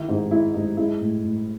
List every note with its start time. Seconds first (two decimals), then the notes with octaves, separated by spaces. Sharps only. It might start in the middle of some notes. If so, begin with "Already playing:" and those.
Already playing: D#3 E4
0.08 G#2 D#4
0.31 G#3 E4
0.54 G#2 D#4
0.77 G#3 E4
1.01 A2
1.23 A2